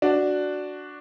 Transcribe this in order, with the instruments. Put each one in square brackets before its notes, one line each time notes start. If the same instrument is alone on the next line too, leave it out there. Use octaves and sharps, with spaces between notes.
[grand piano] D4 F#4